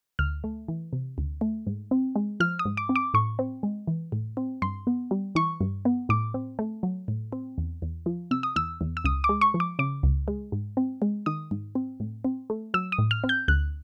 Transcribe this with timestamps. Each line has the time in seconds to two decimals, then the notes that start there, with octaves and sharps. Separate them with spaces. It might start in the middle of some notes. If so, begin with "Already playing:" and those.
0.19 D2 F6
0.44 A3
0.68 E3
0.93 C3
1.18 D2
1.41 A3
1.67 G#2
1.91 C4
2.16 G#3
2.40 F3 F6
2.59 D#6
2.65 G#2
2.77 D6
2.89 C4
2.96 D6
3.14 A2 C#6
3.39 C4
3.63 G#3
3.87 E3
4.12 A2
4.37 C4
4.62 G2 C6
4.87 B3
5.11 G3
5.35 E3 C#6
5.61 G2
5.85 B3
6.09 A2 D6
6.34 C4
6.59 A3
6.83 F#3
7.08 A2
7.33 C4
7.58 E2
7.82 E2
8.06 F3
8.31 C3 E6
8.43 D#6
8.56 E2 E6
8.81 E2
8.97 E6
9.04 C#2 D#6
9.24 D6
9.29 G#3
9.41 C#6
9.54 F3
9.60 D6
9.79 C#3 D6
10.03 C#2
10.28 G#3
10.52 G#2
10.77 C4
11.02 G#3
11.26 D#3 D#6
11.51 G#2
11.75 C4
12.00 A2
12.25 C4
12.50 A3
12.74 F#3 E6
12.92 D#6
12.99 A2
13.11 F6
13.24 C4
13.29 G6
13.48 D2 F#6